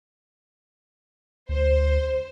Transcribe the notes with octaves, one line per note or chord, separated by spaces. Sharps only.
D2 C5